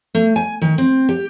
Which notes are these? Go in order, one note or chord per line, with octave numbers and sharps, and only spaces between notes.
A3
G#5
D#3
C4
G4